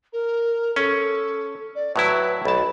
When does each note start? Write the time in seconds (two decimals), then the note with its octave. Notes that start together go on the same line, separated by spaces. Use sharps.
0.13 A#4
0.76 C#4 A4
1.75 D5
1.96 A2 F#3 E4 B4
2.45 B1 A5 B5